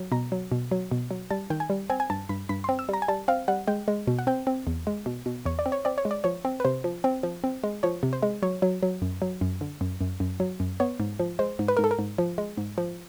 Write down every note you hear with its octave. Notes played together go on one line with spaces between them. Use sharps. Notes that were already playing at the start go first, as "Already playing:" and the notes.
Already playing: F#3
B2 A#5
F#3
B2
F#3
B2
F#3
G3 A5
D#3 G5
G#5
G3
C4 G#5
G#5
G2 A5
G2 B5
G2 B5
C4 C6
E6
G3 A#5
G#5
G3 A5
C4 F5
G3 F#5
G#3 G5
G#3
B2
F#5
C4 G5
C4
E2
G#3
B2
B2
E2 C#5
D5
C4
C#5
C4 D5
C#5
G#3
D5
F3 C#5
C4
B4
C3 C5
F3
C4
F3
C4
G#3
F3 C#5
C3
C5
G#3
F#3 C#5
F#3
F#3
F#2
F#3
F#2
D3
F#2
F#2
F#2
F#3
F#2
B3 C#5
G#2
F3
G#3 C5
G#2
B4
G#2 A#4
A4
A#4
G#2
F3
G#3
G#2
F3